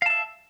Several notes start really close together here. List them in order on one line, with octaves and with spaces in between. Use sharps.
F5 A5 E5